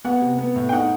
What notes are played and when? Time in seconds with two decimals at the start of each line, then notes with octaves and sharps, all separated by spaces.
0.04 B3 F#5
0.21 C3
0.38 B3
0.56 A2
0.69 G5
0.72 D#4 F#5